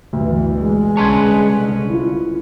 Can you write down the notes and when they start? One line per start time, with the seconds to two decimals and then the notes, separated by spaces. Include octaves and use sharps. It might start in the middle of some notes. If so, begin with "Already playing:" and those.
0.13 D2 G2 B2 E3
0.59 G#3
0.97 C2 D3 C#4 B4 C#5 A5 C6 G#6
1.89 E4 F4